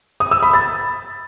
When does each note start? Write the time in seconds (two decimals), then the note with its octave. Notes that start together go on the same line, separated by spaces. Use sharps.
0.20 D#6
0.31 E6
0.42 B5
0.54 A6